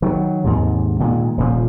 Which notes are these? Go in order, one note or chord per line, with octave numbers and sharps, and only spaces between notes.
D#3 E3 F#3
D#2 G#2 C3
A#2 D#3 G#3
D#1 A#2 F3